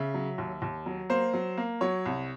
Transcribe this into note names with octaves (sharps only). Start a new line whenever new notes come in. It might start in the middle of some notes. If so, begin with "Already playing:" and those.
Already playing: C#3 E5
F#3
D#2
D#2
F#3
A#3 C5
F#3
A#3
F#3 C#5
C2